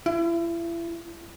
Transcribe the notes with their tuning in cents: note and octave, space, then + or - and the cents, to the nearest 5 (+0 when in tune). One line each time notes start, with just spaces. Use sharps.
E4 +35